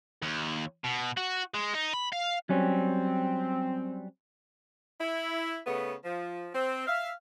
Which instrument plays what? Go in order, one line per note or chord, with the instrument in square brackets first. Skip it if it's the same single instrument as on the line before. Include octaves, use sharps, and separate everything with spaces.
[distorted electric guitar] D#2
B2
F#4
G#3
D#4
B5
F5
[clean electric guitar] F#3 G3 C#4 [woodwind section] C4
[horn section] E4
C#3 A3 B3
F3
C4
E5 F5